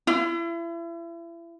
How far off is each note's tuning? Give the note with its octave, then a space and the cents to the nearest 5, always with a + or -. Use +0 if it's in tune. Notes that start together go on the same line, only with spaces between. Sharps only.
E4 +35